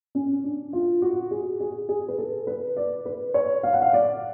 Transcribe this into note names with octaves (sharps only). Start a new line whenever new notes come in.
C#4
D4
F4
F#4
G#4
G#4
G#4
B4
A4
B4
D5
B4
C#5
F5
F#5
F5
D5